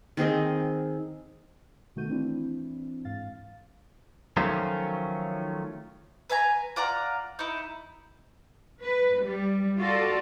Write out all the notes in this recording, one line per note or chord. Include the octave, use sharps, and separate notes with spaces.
D#3 C4 G#4 D#5
B2 D#3 A3 F#4 G6 D#7
E3 C4 D4 E4
G#2 F5 A6
D#3 F3 F#3 A3 C#4 F4
B4 E5 G#5 A#5
F4 D5 F#5 A#5
D#4 E4
B4
G3
F4 F#4 A4 D5